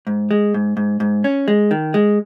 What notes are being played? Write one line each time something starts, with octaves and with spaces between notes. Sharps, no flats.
G#2
G#3
G#2
G#2
G#2
C#4
G#3
D#3
G#3